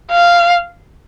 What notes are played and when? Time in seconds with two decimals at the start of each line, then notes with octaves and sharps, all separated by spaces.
0.11 F5